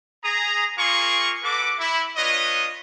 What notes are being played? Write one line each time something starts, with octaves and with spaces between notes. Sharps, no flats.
G#4 A#5 D#6
A#3 F4 G#4 A#4 C6 C#6
F#4 A4 B4 D6
E4
D4 F4 B4 C#5 D#5